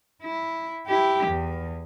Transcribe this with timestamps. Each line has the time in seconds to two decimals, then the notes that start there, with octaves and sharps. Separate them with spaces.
0.23 E4
0.87 E4 G4
1.27 E2